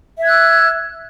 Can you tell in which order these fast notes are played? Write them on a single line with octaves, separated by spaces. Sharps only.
E5 G#6 F#6 E6